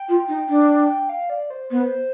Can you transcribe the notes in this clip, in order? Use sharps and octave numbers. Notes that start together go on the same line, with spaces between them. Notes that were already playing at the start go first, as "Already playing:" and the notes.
Already playing: G5
F4
D#4
D4
F5
D5
C5
B3 C5